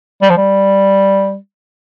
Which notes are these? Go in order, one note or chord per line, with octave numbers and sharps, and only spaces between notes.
G3
F3
G3